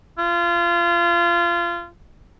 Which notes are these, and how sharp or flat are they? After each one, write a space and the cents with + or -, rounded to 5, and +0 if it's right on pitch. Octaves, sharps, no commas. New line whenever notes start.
F4 -25